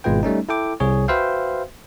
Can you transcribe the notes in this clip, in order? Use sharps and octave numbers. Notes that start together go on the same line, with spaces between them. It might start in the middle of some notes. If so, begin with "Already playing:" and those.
G#1 B2 G#3 F4 B4 G5
G3 A3 C#4 D#4
E4 A4 G5 D6
C2 G#4 C#5
F#4 B4 C5 E5 F5 G5